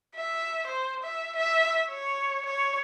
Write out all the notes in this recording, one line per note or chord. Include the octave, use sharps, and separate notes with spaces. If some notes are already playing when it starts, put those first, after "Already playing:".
E5
C5
E5
E5
C#5
C#5